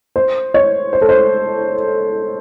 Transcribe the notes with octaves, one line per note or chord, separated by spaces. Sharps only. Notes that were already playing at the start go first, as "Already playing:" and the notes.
C5
C#5
C5
A4
C5